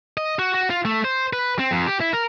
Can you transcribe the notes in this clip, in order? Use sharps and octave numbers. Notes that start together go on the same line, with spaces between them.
D#5
F#4
F#4
F4
A3
C5
B4
C4
F2
G4
E4
A#4